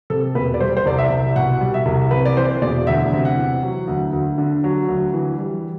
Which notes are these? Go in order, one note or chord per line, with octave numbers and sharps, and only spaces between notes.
C3 A4
E1 B4
D5
G3 C5
C5
C2 D5
E5
C2
B2 F#5
G3
E5
C2
C3 B4
D5
E3 C5
E1 D5
D2 E5
C3
F#5
E3
F#3
D2
D2
D3
F#3
D2
E3
G3